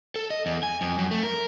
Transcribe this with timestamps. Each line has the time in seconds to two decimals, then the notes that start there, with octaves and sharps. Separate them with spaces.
0.16 A4
0.30 D#5
0.46 E2
0.63 G#5
0.81 F2
0.98 F#2
1.11 A3
1.23 A#4